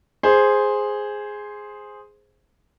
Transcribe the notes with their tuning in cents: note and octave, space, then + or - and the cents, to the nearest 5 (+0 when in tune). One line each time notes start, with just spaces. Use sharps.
G#4 +0 C5 +0